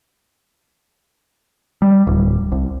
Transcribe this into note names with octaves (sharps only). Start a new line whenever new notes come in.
G3
D1
C2